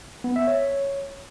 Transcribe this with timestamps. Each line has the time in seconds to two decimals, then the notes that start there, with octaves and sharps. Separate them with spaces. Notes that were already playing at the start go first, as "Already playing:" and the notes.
0.24 B3
0.36 E5
0.48 C#5